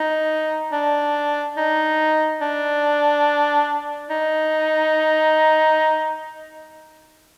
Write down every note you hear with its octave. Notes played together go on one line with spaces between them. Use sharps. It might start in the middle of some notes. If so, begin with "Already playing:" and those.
Already playing: D#4
D4
D#4
D4
D#4